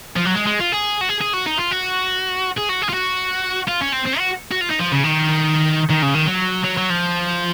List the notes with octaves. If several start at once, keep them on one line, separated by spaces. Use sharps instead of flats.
F3
F#3
G#3
G#3
F4
G#4
F#4
G#4
G#4
F#4
D#4
F4
F#4
G#4
F#4
G#4
F4
F#4
F4
C#4
C4
C4
F#4
F#4
F4
D#4
F3
C#3
D#3
D#3
C#3
D#3
F#3
F#3
F#3
F3